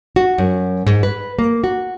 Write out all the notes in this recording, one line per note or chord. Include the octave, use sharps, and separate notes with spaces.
F#4
F#2
G#2
B4
A#3
F#4